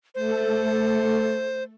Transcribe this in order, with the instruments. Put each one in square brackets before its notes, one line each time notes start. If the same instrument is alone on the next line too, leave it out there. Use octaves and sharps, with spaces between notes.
[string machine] A3 A4 [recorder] C5